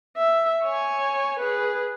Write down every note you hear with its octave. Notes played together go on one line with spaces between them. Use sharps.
E5
C#5 G#5
G#4 B4